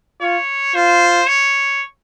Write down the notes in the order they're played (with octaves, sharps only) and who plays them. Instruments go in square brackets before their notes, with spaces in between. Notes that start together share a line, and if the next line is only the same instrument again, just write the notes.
[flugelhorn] F4 [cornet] C#5
[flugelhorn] F4 [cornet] C5
[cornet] C#5